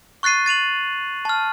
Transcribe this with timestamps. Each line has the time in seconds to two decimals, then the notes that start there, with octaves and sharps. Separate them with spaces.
0.23 C#6 F#6 A6 C7 D#7
0.46 A6 D#7 F7 F#7
1.25 A5 F6